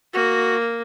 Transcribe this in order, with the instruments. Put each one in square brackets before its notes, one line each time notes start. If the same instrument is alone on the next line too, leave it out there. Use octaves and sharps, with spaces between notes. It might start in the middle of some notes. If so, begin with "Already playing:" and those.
[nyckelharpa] A#3 [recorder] F#4